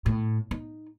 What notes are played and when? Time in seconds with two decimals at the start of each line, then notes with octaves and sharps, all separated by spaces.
0.06 A2
0.51 D#4